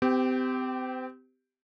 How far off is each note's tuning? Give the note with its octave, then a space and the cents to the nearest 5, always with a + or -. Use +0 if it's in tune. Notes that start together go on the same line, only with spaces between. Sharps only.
C4 -35 G4 +0